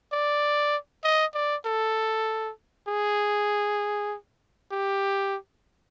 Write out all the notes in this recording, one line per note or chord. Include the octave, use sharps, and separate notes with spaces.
D5
D#5
D5
A4
G#4
G4